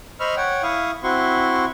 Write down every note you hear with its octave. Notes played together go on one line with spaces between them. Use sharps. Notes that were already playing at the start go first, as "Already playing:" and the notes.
C5 D#5 B5 C#6 E6 F6
C#5 F#5 G5
E4 F5 C#6 D#6
C4 E4 F#4 C6 C#6